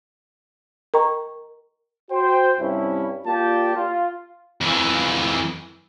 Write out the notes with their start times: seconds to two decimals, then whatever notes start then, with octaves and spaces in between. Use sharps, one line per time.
0.94 A#4 D#5 G5 A#5 C#6
2.10 F#4 C5 G5
2.60 G2 C3 C#4 E4
3.26 A#3 F4 G4 D5 G5 A5
3.75 F4
4.61 F2 E3